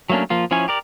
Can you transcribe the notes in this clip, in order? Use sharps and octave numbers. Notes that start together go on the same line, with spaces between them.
F#3 A3 A#3 C#4 D4
F3 A#3 F4
F3 C#4 E4 C#5 G#5
G4 A#4 D5